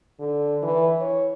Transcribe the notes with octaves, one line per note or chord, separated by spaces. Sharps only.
D3
E3
C#5